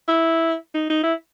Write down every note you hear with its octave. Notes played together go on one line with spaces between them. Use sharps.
E4
D#4
D#4
E4